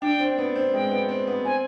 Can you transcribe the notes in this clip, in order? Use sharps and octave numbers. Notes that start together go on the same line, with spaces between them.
D4 G5
C4
B3
C4
G#3 G5
B3
C4
B3
C4 G#5